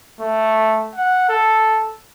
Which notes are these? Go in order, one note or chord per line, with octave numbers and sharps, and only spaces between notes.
A3
F#5
A4